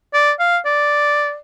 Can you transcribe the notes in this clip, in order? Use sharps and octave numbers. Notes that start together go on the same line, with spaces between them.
D5
F5
D5